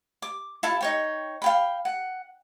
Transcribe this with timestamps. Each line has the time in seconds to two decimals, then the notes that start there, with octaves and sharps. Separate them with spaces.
0.22 D6
0.63 E4 F4 A4 A5
0.81 D#4 C#5 G5
1.42 F5 G5 B5
1.85 F#5